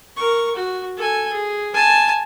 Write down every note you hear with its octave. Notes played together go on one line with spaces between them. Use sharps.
A#4 C#6
F#4
A4 G#5
G#4
G#5 A5